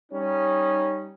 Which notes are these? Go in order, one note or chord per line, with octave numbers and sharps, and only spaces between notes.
G3 C#4 D#4